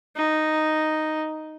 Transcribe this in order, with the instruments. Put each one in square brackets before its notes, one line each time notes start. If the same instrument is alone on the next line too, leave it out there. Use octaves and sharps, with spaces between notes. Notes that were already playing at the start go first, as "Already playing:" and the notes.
[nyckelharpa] D#4